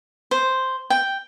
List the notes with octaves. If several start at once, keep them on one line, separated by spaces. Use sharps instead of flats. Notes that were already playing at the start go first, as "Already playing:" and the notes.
C5
G5